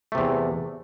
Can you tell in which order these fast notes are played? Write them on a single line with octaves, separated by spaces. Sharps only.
A3 C3 E2